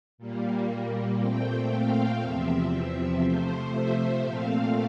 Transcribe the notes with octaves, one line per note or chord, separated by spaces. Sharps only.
A#2 G3 A#3
A#2 A3 C4 G5
F5
E2 C3 F3 C4 E5
C3 F3 A3 C5
E5
A#2 A3 C4 F5